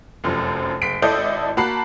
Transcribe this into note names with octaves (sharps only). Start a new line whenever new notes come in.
F1 F#2 F3 C5
F#1 B6 C7 D7
G#1 E4 A4 D5 D#5 G6
A#3 F#4 A5 B5 F#6 C7